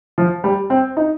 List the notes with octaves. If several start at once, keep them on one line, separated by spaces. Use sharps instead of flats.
F3
G3
C4
D#4